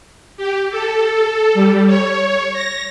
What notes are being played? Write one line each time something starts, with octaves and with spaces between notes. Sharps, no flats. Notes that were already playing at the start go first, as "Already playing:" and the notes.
G4
A4
G3
C#5
A#6